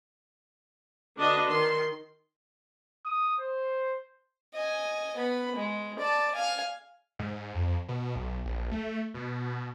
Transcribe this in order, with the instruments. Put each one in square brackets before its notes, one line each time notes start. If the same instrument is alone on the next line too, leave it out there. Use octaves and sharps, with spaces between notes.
[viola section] D3 D4 F#4 B4 D#5
D#3 C6
[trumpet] D#6
C5
[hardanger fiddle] D#5 G#5
B3 B5
G#3
D5 A5
F5 G#5
[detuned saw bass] G#2
F2
B2
B1
A#1
A3
B2